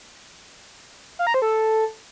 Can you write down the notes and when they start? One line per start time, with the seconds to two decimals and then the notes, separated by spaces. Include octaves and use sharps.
1.19 F5
1.27 A#5
1.34 C5
1.42 A4